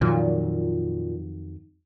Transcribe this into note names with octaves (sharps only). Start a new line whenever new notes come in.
F2 A#2 D#3 F#3